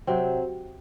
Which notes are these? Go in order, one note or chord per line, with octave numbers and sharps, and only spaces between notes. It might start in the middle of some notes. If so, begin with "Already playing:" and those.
C3 F#3 C4